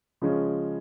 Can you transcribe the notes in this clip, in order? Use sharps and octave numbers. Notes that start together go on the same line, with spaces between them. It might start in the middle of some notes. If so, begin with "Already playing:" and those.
C#3 F3 G#3 C#4